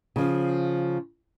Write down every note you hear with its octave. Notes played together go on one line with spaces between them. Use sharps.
C#3 F3